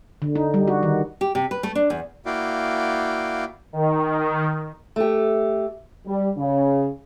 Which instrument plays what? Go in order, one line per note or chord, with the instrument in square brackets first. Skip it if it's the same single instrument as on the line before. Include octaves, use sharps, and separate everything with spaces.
[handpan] D3
D#4
G3
F#4
D#3
[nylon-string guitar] G4
C3
B4
A3
D4
E2
[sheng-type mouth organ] A#3 E4 F#4 D5 F5 G5
[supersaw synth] D#3
[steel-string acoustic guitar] A3 G4
[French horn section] G3
C#3